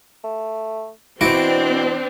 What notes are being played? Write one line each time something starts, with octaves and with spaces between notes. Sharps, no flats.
A3
B2 E3 C4 D4 E4 F#4 D6